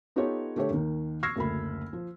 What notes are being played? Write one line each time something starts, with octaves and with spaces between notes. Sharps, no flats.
B3 D#4 F4 G4 A4 C#5
D3 A3 G4 A4 C#5
D#2 D#3
C#6 E6 F6 G#6 A#6 C7
F#1 D2 B5
F3